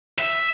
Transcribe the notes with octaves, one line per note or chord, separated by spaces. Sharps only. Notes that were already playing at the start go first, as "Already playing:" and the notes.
E5